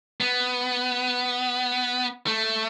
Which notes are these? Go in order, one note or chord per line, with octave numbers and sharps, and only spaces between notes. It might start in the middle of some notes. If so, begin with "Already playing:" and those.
B3
A3